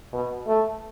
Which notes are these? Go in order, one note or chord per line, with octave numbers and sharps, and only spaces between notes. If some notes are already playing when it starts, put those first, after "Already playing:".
B2
A3